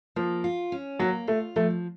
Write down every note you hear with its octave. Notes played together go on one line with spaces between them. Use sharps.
F3 A#3
F4
C#4
F#3 A#3
A3 F4
F3 A3